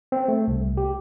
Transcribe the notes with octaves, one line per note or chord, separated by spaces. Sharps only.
C4
A3
C2
G4